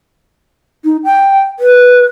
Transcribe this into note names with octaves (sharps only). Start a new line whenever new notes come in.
D#4
G5
B4